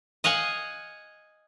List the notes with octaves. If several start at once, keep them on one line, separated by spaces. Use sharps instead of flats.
D#5 F5 F#5 G#5